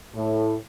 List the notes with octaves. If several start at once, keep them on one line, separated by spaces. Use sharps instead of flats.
A2